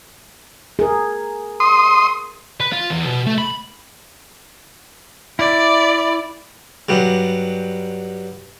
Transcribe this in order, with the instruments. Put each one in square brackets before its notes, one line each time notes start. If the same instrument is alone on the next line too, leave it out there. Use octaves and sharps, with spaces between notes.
[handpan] G#4 A#4
[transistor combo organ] C6 D#6
[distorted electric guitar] B4
F4
E2
B2
A3
B5
[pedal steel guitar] E4 [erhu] D5
[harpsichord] G2 F#3 G3